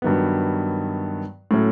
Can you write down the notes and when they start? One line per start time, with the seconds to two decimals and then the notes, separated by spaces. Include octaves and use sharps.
0.02 G2 D#3 F#3 B3
1.51 A2 F#3 A3 C#4